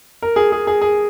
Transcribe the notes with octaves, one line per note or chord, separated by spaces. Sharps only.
A#4
G#4
G#4
G#4
G#4